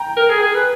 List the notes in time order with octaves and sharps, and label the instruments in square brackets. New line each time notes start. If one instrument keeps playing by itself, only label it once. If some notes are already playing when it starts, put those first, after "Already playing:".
Already playing: [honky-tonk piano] G5 A#5
[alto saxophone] A#4
G#4
G#4
B4